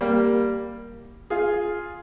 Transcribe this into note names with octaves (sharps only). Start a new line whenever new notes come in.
G3 A#3
F4 G#4